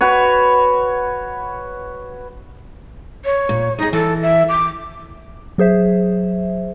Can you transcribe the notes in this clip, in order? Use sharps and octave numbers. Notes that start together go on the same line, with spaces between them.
F#4 B4 C#5
C#5
A#2
D#4 G#4 D#5
E3 A4
E5
D6
F#3 G#4 C5 E5